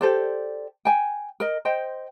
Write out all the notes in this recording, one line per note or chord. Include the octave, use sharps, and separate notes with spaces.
G4 A4 C5 D5
G5 G#5
A#4 D#5
C5 D#5 G5